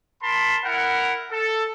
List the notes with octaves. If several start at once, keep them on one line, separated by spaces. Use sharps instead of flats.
A#4 A5 B5 C6
E4 A#4 F#5
A4